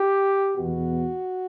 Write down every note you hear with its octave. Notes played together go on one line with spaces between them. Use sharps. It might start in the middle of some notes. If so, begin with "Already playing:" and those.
Already playing: G4
E2 B2 F#4